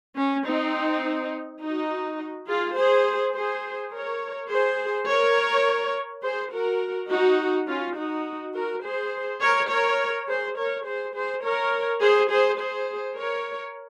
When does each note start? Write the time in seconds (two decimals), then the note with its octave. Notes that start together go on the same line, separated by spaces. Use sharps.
0.17 C#4
0.45 C4 D#4
1.61 D#4 F#4
2.48 F4 G#4
2.77 G#4 C5
3.34 G#4 C5
3.93 A#4 C#5
4.50 G#4 C5
5.08 A#4 C#5
6.23 G#4 C5
6.52 F#4 A#4
7.10 D#4 F#4
7.68 C#4 F4
7.96 D#4 F#4
8.55 F#4 A#4
8.84 G#4 C5
9.41 A#4 C#5
9.70 A#4 C#5
10.28 G#4 C5
10.57 A#4 C#5
10.86 G#4 C5
11.15 G#4 C5
11.43 A#4 C#5
12.01 G#4 C5
12.30 G#4 C5
12.59 G#4 C5
13.17 A#4 C#5